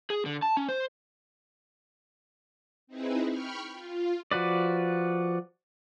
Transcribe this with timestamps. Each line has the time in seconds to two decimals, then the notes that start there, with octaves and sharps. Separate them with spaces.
0.10 G#4
0.26 D3
0.42 A5
0.57 C#4
0.69 C5
2.87 C4 D#4 E4 G#4 B4
3.27 G5 B5 C#6 F6
3.72 F4
4.31 F3 F#4 B4 D5